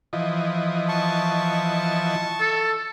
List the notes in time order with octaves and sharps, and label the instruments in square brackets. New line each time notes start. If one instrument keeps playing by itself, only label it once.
[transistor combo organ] E3 F3 D#5
[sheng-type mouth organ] A5 C#6
[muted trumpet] A4